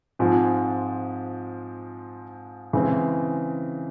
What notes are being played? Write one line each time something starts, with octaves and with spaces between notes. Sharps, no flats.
G#2 F3 G#3 C4 F4
C#3 E3 G#3 C4